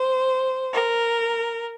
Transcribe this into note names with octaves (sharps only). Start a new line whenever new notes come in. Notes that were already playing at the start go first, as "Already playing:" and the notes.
Already playing: C5
A#4